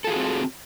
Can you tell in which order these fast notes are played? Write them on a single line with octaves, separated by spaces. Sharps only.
A4 F4 G#4 F#4 C4